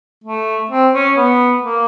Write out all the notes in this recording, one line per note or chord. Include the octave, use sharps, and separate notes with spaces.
A3
C4
C#4
B3
A#3